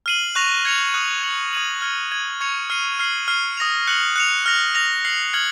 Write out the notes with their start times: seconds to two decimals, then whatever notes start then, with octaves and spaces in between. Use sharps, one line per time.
0.06 F6 C7 D#7 F#7
0.35 C#6 F#6 A#6 F7
0.65 G#6 C#7 F7
0.93 D#6 F#6 C#7 F#7
1.23 G#6 C#7 F#7
1.53 D#6 G#6 D#7 F#7
1.82 F6 G#6 C#7
2.12 G#6 D#7 F#7
2.41 C#6 G#6 C#7 F7
2.70 F6 C7 D#7
2.99 F6 C7 F#7
3.28 F6 C7 D#7
3.57 D#6 A#6 F7
3.87 F#6 C#7 F#7
4.16 F#6 C#7 F7
4.46 F6 A#6 F7
4.75 F6 A#6 F7
5.05 F6 C7 F#7
5.33 F6 G#6 C#7 F#7